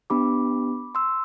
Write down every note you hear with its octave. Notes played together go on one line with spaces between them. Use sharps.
B3 D4 G4 B5 D6
C6 E6